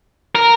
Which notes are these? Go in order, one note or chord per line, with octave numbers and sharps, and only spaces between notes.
A#4